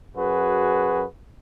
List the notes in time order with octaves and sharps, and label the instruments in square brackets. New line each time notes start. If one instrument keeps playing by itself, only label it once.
[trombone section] F#2 F#4 G#4 B4